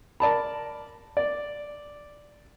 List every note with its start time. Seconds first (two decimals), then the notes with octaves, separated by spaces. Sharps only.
0.20 A#4 D5 A5 B5
1.17 D5